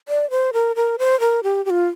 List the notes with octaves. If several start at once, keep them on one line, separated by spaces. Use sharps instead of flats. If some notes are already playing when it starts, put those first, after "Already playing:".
D5
C5
A#4
A#4
C5
A#4
G4
G4
F4